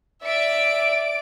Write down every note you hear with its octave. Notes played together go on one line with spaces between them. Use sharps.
D5 E5 D7